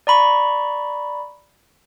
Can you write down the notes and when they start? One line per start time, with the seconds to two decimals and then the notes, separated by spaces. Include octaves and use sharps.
0.07 D5 A#5 B5 C#6